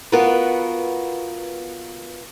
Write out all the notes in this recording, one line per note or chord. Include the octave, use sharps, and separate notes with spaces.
B3 F4 F#4 A#4 B4